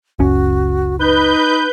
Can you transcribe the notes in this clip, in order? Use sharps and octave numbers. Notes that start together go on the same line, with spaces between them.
F#1 C#2 C#4 F#4
D#4 B4 G6